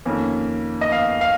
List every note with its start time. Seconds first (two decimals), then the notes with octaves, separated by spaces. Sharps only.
0.06 F2 D#3 A#3 C#4
0.81 D#5
0.92 F5
1.21 F5